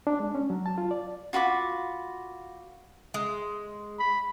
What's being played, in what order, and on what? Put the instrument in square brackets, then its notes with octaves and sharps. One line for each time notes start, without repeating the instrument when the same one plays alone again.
[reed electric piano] D4
G#3
C#4
F#3
A5
F4
D5
[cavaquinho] F4 F#4 B5 D6
[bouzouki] G#3
[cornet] B5